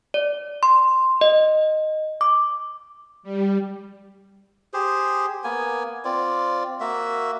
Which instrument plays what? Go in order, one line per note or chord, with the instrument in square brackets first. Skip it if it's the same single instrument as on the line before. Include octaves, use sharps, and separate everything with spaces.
[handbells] D5
C6
D#5
D6
[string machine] G3
[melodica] G4 G#4 C5
A#3 B3 G#5
C4 F4 D5
A#3 F#4 E5